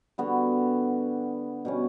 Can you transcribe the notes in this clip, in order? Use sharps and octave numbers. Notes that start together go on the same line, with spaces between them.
D3 G3 B3 F#4
B2 G3 C#4